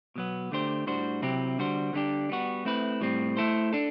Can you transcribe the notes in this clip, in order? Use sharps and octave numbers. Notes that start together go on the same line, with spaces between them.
B2 F#3 B3
D3 A3 D4 G4 C5
A2 G3 D4 F#4 C5
C3 F#3 C4 E4 G4
D3 G3 D4 F#4 C5
D3 G3 B3 D4 G4
G3 B3 F#4
A3 C4 E4 B4
A2 G3 C4
A3 E4 A4 C5
D4 A4